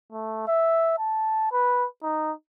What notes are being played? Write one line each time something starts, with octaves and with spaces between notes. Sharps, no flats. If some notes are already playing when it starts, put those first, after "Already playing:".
A3
E5
A5
B4
D#4